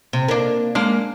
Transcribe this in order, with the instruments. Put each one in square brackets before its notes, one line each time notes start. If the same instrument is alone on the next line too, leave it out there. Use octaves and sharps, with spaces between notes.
[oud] C3
A#3 D4
[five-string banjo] G#3 A#3 [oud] D4